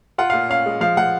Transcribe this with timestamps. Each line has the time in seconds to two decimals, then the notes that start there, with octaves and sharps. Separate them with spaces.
0.18 F4 F#5
0.30 A#2 F5
0.49 C#4 F5
0.66 G#3
0.81 F3 F5
0.97 F3 F#5